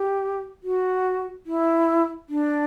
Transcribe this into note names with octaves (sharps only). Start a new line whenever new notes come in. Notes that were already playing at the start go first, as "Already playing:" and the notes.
Already playing: G4
F#4
E4
D4